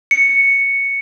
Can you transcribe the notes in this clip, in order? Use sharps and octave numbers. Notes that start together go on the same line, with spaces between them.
C#7